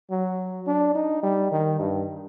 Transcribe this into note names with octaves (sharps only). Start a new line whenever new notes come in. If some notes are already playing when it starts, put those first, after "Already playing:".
F#3
D4
D#4
G3
D#3
G2